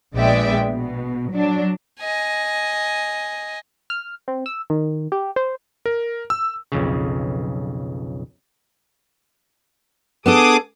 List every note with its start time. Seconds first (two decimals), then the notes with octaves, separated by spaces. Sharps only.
0.14 A#1 G#3 B3 D5 E5 G5
0.68 B2
1.32 F#3 D4
2.00 D#5 G#5
3.90 F6
4.28 C4
4.46 E6
4.70 D#3
5.12 G4
5.36 C5
5.86 A#4
6.30 E6
6.72 B1 F2 C#3
10.26 B3 D4 G#4 A4 D6 D#6